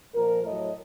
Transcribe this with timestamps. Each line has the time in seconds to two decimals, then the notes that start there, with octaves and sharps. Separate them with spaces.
0.14 A#2 F3 A#4
0.43 A2 F#3 D#5